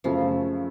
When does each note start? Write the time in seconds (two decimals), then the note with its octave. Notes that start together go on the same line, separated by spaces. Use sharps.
0.04 F#2 C#3 F3 A3